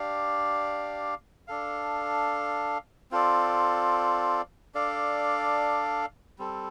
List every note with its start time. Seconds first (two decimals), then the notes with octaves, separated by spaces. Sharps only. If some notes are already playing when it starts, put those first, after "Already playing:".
Already playing: D4 G4 D5 F5
1.47 D4 A4 F5
3.11 C4 F4 A4 D5
4.74 D4 A4 D5 F5
6.38 G3 C4 A4